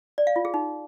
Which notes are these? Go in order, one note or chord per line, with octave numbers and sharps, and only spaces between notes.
D5
F5
F4
G#4
D#4